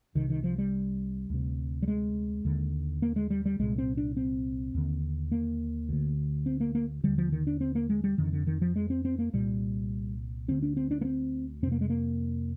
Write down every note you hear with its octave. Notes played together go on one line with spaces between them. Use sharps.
C2 C3 D#3
D#3
F3
G3
D2 C3
G3
G#3
D#2 D3
A#3
G#3
G3
G3
C2 A#2 G#3
C4
D4
C4
D#2 D3
A#3
D2 D3
C4
A#3
A#3
D#2 D3 G3
F3
D#3
D4
C4
A#3
G#3
G3
F2 D3 D#3
D3
D#3
F3
G#3
C4
C4
A#3
C2 A#2 G3
D2 D3 C4
D4
C4
D4
A#3
C4
F2 C3 C4
A#3
G#3
A#3